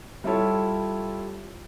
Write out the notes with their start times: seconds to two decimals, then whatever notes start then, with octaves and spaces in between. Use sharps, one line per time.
0.24 G3 E4 F4 G4 A4 C#5